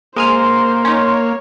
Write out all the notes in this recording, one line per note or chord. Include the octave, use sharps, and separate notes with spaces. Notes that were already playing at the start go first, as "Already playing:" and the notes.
G#3 A#3 C5 G#5 C6 F6
C#4 D#4 C#5